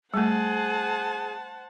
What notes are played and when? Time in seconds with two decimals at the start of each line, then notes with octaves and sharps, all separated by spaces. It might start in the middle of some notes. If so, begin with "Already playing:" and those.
0.14 G3 A3 G#4 C5 F#5 A5